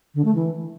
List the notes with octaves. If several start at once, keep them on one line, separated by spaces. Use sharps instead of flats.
D3
A3
E3